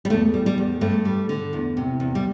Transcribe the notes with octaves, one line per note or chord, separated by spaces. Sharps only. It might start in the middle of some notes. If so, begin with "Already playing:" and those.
G3
E2 A3
G3
G3
E2
G2 A3
G3
D3
E2
C3
E2
G3